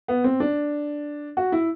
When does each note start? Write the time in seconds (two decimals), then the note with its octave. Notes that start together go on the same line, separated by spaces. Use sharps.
0.08 B3
0.24 C4
0.40 D4
1.37 F#4
1.52 E4